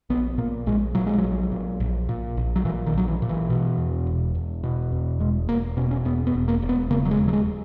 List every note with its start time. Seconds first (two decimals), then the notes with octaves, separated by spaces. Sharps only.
0.10 A#1 B3
0.38 A#2 A#3
0.66 A#1 G#3
0.95 A#2 F#3
1.06 G#3
1.18 F#3
1.23 A#1
1.52 A#2
1.80 A#1
2.09 A#2
2.37 A#1
2.56 F#3
2.65 A#2 E3
2.86 D#3
2.93 A#1 F#3
3.08 E3
3.22 A#2
3.29 E3
3.50 B2
3.78 E2
4.07 E1
4.35 E1
4.63 B2
4.92 E2
5.20 E1 G#3
5.48 E1 A#3
5.77 B2 C#4
5.91 C#4
6.05 E2 B3
6.27 B3
6.34 E1
6.48 A#3
6.62 E1
6.69 B3
6.90 C#3 A#3
7.05 F#3
7.11 G#3
7.19 D#2
7.28 F#3
7.33 G#3